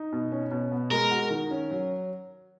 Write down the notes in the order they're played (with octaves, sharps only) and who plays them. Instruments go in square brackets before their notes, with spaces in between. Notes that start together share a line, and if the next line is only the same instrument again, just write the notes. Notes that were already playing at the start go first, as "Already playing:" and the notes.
Already playing: [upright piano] D#4
B2
C#4
B2
B3
[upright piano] G#3 [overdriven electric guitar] A#4
[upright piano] F#4
D#3
C#4
F#3